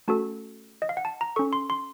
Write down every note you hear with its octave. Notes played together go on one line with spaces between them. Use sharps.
A3 C#4 F#4 A4 A5
D#5
F5
F#5
A5
A#5
C#4 A4 C#6
C6
C6